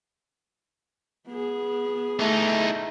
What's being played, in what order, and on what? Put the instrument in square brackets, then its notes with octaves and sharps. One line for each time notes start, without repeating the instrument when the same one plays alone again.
[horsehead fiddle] B3 G#4
[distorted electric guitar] E3 D#4 [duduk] A3